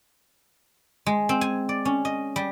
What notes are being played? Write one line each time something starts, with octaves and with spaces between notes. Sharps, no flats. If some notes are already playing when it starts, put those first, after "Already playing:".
G#3
C4
G#5
D5
C#4
D#5
G3